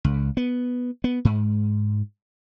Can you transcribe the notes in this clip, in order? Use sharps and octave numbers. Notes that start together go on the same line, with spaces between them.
C#2
B3
B3
G#2